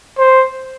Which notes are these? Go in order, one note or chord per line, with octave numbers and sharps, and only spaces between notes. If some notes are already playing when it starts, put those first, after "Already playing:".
C5